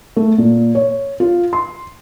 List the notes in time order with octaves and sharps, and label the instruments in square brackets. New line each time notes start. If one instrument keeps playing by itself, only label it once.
[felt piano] A3
A#2
C#5
F4
C6